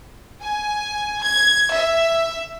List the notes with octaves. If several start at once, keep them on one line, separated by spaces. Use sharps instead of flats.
G#5
G#6
E5